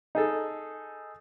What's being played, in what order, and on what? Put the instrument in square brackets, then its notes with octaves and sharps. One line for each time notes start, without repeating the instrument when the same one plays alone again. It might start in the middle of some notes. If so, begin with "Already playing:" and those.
[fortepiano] D#4 G#4 A4